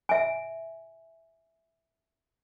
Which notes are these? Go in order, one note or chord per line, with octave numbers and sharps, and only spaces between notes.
E5 G#5